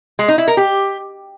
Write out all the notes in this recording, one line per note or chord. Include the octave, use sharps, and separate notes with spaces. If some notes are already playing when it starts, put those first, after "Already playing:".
G#3
D#4
E4
A#4
G4